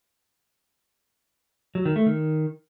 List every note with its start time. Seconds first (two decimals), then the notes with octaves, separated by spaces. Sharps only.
1.75 F#3
1.85 D#3
1.96 A3
2.06 D#3